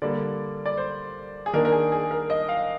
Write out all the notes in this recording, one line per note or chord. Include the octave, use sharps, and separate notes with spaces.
D3 G3 A#3 D5
D5
C5
G#4
D#3 A#3 D4 A#4
A#4
G#4
G#4
A#4
D#5
F5